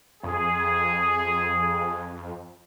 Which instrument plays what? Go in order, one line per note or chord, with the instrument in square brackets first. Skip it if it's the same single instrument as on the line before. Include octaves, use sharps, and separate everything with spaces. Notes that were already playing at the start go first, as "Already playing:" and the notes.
[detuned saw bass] F2 [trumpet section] G#4